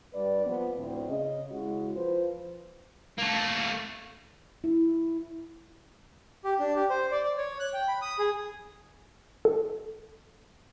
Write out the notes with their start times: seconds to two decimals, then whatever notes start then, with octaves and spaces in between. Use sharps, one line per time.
0.14 G2 B4 D5
0.45 F3 B3
0.76 D2 A2 C4
1.08 C#3 D#5
1.52 C#3 G#3 E4 F#4
1.96 F3 F4 B4 C5
3.18 A3 A#3
4.64 E4
6.44 G4
6.59 D4
6.76 G4
6.90 C5
7.12 D5
7.24 D5
7.38 C#5
7.60 F#6
7.74 G5
7.88 B5
8.02 D#6
8.19 G#4
9.45 A4